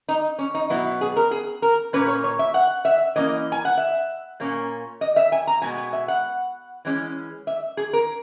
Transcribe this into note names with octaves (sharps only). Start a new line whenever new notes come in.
D#4
C#4
D#4
B2 F#3 B3 E4
G#4
A#4
G#4
A#4
A#2 A#3 C#4 B4
C#5
C#5
E5
F#5
E5
E3 A#3 C#4 D#5
G#5
F#5
E5
A#2 A#3 C#4
D#5
E5
G#5
A#5
B2 G#3 B3 G#5
G#5
E5
F#5
E3 G#3 C#4
E5
G#4
A#4